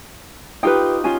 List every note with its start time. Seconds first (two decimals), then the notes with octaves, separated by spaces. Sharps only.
0.63 D#4 F4 G4 B4 G5
1.04 C#4 F4 G#5